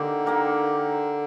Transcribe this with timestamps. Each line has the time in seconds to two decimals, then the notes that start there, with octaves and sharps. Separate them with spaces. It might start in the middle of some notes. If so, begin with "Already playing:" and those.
Already playing: D3 A#3 D#4 G4 A#4
0.26 A#3 D#4 G4 A#4